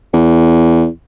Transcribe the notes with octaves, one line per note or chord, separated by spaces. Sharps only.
E2